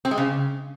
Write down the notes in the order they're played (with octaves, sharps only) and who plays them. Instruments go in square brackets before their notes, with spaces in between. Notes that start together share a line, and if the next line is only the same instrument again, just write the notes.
[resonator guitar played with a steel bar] C4
G#3
C#3